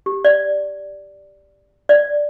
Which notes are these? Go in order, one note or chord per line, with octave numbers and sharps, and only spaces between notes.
G4
D5
D5